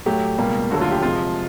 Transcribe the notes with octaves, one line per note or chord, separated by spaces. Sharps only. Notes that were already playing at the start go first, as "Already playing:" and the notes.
A2 F#3 A3 G4
C#2 B2 G3 A#3
D#2 D3 F#3 A3 F#4
F4
G4
F2 C3 F3 G#3 F4